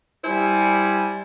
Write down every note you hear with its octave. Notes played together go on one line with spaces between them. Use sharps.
G3 E4 C5 G#5